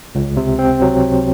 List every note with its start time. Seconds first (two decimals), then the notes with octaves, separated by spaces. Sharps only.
0.15 C#2
0.37 C3
0.59 C4
0.82 F#3